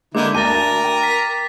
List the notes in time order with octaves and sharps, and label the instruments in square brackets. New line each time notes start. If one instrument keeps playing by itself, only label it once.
[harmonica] D3 D#4 E4 [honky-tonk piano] G#3 A#3 [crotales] D6
[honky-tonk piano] D2 D4 A5 [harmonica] A#4 [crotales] A6 D#7
[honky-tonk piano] G5
[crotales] B6